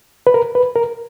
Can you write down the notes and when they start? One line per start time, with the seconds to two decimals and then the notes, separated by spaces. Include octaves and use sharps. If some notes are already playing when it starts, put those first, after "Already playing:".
0.27 B4
0.34 A#4
0.55 B4
0.76 A#4